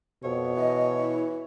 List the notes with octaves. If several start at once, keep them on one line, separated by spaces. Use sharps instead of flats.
F2 B2 C#5
E3 D#5
E4